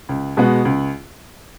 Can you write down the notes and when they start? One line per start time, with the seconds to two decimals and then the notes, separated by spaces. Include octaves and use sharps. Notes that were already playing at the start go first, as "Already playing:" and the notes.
0.09 C#2
0.37 B2 G#3 B3 F#4
0.65 C#2